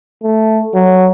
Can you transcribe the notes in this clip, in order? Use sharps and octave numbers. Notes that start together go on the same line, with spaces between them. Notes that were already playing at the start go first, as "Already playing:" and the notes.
A3
F#3